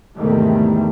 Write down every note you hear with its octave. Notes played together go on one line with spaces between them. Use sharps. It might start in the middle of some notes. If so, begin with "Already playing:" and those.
E2 G#2 C3 D#3 G3 A3